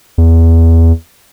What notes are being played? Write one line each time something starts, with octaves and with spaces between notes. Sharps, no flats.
E2